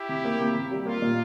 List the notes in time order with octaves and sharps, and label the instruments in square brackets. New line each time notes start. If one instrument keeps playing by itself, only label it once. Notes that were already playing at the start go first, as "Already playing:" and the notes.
Already playing: [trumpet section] E4 G4
[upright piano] C3
A#3
C3
C3
G3
[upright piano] A#3 [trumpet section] F4
[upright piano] A#2